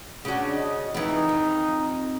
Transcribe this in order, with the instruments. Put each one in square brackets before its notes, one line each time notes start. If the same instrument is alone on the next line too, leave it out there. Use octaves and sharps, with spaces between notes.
[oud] C#3 F#4 [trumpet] D4
[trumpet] D#5
[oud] F2 E3 [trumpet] D#4
[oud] F2